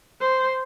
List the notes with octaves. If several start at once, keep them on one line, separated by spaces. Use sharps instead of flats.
C5